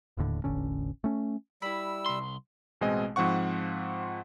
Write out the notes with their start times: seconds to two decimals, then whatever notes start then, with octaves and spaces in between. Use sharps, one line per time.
0.17 D#1 D#2 A2 D3
0.44 E1 A1 D3 C#4
1.04 A3 C#4
1.62 G3 E4 B5 E6
2.06 C2 C6
2.81 A1 B2 G#3 C4 D#5 G#5
3.16 G#2 F3 C4 F#5 C#6